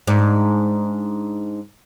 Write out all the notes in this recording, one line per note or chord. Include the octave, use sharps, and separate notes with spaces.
G#2 D4